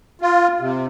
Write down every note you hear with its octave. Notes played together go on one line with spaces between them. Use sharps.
F4
C3